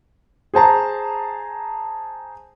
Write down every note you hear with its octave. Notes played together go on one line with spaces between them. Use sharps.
G#4 C5 A5 A#5